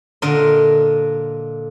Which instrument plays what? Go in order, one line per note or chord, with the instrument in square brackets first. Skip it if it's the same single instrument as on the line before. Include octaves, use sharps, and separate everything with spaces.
[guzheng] A#2 D3 A#4 D#5